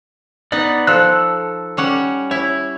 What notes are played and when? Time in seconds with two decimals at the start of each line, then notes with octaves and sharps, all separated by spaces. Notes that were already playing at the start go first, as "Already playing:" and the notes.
0.52 B3 D#4 D5
0.87 F3 A4 E6 F#6
1.77 G3 C#4 F#5
2.31 E4 C#5